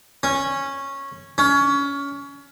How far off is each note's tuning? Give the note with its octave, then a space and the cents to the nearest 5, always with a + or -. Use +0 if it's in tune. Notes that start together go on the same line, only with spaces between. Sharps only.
C#4 -10
C#4 +25